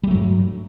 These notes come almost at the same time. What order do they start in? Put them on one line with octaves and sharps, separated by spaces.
G3 A3 F#3 G2